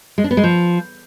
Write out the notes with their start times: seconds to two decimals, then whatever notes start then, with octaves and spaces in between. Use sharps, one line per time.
0.18 G#3
0.24 D4
0.31 B3
0.37 G#3
0.44 F3